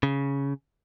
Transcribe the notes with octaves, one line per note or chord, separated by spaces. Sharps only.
C#3